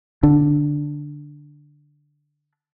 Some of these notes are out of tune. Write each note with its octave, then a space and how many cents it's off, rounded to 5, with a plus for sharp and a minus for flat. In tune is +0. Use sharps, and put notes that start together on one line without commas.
D3 +0 D4 +0